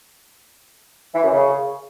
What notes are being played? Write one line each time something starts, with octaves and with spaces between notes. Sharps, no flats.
E3
F#2
C#3